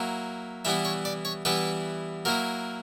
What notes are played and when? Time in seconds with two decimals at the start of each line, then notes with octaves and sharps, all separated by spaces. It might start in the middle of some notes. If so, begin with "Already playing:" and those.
Already playing: F#3 A#3 E4
0.65 E3 G3 B3 E4 E5
0.85 C#5
1.05 D5
1.25 C#5
1.45 E3 G3 B3 E4 B4
2.25 F#3 A#3 E4 A#4